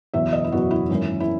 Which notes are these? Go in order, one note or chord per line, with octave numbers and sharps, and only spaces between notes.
F#1 E2 B2 E5
D#5
E4
F#1 E2 B2 F#4
E4
G#1 F#2 E3 A#3 C#4
E4